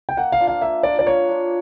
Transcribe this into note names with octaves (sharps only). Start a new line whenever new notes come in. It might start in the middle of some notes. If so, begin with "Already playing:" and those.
G5
A#3 F#5
F5
D4 F4
F5
A#3 E5
D4 F4 D5
D5
A#3 C#5
D4 F4